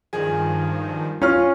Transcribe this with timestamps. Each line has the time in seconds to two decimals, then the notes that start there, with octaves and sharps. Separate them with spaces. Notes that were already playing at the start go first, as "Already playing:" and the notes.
0.13 G2 D#3 F3 G#4
1.22 C#4 F4 F6